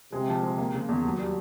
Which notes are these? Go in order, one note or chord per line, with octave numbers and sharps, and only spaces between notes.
C3 G#3
F3
G#3
A#3
C#3
E2
D#2 F#3
G3